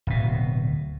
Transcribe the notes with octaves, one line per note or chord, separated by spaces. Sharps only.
D1 B2